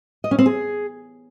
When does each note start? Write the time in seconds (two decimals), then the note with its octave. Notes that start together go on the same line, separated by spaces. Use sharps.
0.24 D#5
0.31 C#4
0.39 C4
0.46 G#4